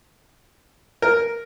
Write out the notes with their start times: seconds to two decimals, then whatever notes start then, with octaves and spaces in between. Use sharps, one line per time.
1.02 A#4